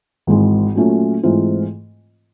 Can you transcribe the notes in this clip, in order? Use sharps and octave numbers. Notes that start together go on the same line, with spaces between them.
G#1 G#2 E3 G#3
A#2 F#3 A3 C#4 F4
G#2 E3 A3 C4 F4